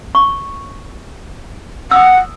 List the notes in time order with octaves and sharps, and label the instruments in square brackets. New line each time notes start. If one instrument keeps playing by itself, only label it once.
[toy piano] C#6
[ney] F#5 [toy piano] D#6 E6